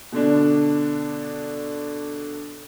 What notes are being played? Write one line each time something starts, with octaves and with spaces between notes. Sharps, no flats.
B2 D3 D4